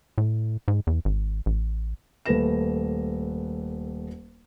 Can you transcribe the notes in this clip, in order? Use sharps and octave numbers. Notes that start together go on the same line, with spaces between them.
A2
G#2
E2
G#1
A1
D#1 A3 A#3 B4 A#6 E7